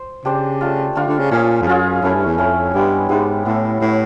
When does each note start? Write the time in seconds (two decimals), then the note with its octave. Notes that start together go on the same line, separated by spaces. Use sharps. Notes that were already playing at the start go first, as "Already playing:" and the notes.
Already playing: C5
0.25 C#3 D4 G4 C5
0.61 A3 D4 F4
0.96 D3 A3 D4 F4
1.08 D3
1.19 C#3
1.31 A#2 C#4 F4 G#4
1.62 F2
1.67 F#2 C#4 F4 G#4
2.02 F#2 A3 C#4 E4
2.14 G2
2.26 E2
2.38 F2 A3 C#4 E4
2.74 G2 G#3 B3 E4 G4
3.09 G#2 G#3 B3 E4 G4
3.45 A2 B3 E4 A4 C#5
3.81 A2 B3 E4 A4 C#5